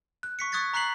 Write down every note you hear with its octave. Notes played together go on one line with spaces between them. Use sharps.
F#6
C#6 B6 C#7
C#6 D#6 F#6 G#6 A6 C#7
A#5 C#6 F#6 B6 C7 F#7